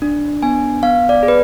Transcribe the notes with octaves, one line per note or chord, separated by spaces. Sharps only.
D4
B3 G#5
B3 F5
D5
G#4
B4